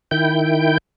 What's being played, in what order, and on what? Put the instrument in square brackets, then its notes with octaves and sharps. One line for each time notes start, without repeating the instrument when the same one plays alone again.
[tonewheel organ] D#3 E4 G5 G6